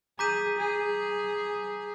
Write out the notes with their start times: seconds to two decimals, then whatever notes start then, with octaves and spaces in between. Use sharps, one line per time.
0.19 G#4 A#5 D6 G6 B6 D#7
0.58 G#4